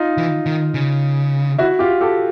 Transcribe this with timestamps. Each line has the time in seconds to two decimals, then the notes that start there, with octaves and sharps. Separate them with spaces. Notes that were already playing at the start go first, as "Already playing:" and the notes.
Already playing: D#4 F4
0.17 E3
0.46 D#3
0.74 C#3
1.58 E4 F#4
1.79 F4 G4
2.01 G4 A4